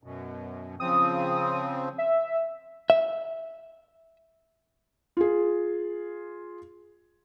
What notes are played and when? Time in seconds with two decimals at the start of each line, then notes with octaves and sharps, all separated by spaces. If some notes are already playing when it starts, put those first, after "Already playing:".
0.03 F#2 B2
0.80 C#3 F3 C4 D#6
1.98 E5
2.90 E5
5.17 F4 G#4